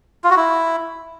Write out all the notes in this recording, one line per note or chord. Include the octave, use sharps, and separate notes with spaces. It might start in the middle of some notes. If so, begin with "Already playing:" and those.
F4
F#4
E4